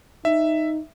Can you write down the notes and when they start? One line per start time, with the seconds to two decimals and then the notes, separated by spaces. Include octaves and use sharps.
0.25 D#4 E5